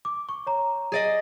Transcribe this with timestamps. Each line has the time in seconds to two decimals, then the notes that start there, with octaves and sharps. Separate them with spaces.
0.05 D6
0.29 C#6
0.47 C#5 A#5
0.92 G#4 D5 D#5